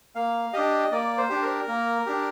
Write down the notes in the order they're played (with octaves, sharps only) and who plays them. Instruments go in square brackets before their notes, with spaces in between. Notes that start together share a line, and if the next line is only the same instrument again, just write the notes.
[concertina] A#3 F5
D4 G4 D#5
A#3 D5
C5
D4 G4
A#4
A#3
D4 G4